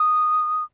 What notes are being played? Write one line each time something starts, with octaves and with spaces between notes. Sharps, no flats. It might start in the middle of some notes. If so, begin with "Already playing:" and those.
Already playing: D#6